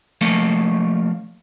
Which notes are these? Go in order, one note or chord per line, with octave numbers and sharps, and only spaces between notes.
F3 A3 A#3